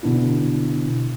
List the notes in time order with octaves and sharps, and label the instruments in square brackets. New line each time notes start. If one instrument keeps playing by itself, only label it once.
[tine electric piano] B2 D3 B3 D4 E4